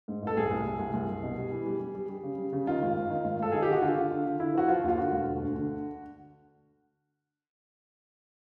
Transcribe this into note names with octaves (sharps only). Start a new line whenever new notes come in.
G#2
A1 A4
C2 G#4
C2
C2
C2
C2
C2
B2
G3
E3
G3
G3
G3
G3
C#3
G3
C#3
D#3 F4
G#1
G#1
D#3
G#1
G#1 A4
D#3 G#4
G4
D#3 F#4
D3 F4
D3
D3
D3
D3 E4
F3 F#4
F3 F4
D#2 F4
D3 F#4
E1
D3
D2
D3